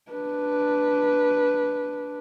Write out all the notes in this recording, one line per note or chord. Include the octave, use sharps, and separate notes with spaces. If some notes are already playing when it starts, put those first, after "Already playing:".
D4 B4